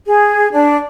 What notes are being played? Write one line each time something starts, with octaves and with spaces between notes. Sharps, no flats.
G#4
D4